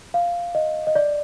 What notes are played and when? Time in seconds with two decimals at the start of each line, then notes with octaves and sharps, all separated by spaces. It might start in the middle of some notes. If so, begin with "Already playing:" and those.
0.14 F5
0.55 D#5
0.87 D#5
0.95 D5